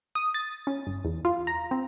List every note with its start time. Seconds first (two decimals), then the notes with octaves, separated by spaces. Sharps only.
0.15 D#6
0.34 A6
0.67 C#4
0.87 G1
1.05 E2
1.25 F4
1.47 A#5
1.71 C4